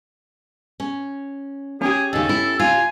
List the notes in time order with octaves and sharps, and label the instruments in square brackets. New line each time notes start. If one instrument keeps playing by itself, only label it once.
[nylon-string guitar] C#4
[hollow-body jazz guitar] C#4 G4 [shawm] G#4
[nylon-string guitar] D#2 C#3 [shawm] A4
[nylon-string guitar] E4
[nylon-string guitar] F4 [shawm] G#5